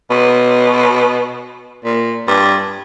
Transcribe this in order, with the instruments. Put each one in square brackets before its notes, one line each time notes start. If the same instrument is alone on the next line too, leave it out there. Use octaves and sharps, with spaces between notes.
[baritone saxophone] B2
A#2
G2